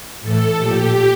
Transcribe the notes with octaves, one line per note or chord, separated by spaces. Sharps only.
A2 E3 A4
A#2 F3 G4